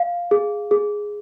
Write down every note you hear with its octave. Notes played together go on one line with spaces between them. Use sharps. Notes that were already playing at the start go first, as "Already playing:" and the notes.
Already playing: F5
G#4
G#4